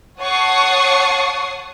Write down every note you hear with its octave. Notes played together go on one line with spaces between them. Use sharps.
C#5 F#5 A5 C#6 D#6 C7